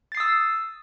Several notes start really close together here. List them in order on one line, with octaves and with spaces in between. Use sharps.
A6 C7 D#6 E6